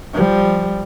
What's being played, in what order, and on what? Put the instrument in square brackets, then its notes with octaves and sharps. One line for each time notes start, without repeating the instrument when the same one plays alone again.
[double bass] F3 G3